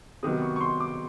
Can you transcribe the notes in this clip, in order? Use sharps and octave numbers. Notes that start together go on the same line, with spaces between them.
C3 D#3 F#3 B3 D#6
C#6
C#6
C6
D6